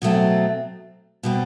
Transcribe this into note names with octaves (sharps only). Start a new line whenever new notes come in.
B2 F#3 A3 C4
B2 G3 C4